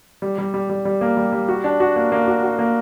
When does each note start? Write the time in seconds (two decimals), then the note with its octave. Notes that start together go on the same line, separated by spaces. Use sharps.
0.22 G3
0.38 G3
0.54 G3
0.69 G3
0.85 G3
1.01 A#3
1.17 G3
1.32 G3
1.48 F#4
1.64 D4
1.80 F#4
1.96 A#3
2.12 A#3
2.28 F#4
2.43 F#4
2.59 A#3